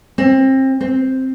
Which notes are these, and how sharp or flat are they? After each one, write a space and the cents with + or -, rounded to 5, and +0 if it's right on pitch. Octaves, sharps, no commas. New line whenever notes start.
C4 +30
C4 +5